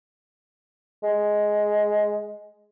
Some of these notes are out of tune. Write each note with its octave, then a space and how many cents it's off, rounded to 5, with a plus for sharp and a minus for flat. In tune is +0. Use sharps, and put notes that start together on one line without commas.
G#3 +10